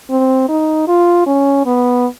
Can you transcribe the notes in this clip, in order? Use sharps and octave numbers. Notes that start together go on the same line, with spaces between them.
C4
D#4
F4
C#4
B3